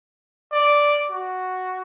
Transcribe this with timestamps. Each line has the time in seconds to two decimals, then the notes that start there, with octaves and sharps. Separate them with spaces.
0.52 D5
1.11 F#4